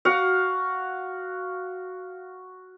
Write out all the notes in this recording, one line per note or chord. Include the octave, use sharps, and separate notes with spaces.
F#4 F5 F#5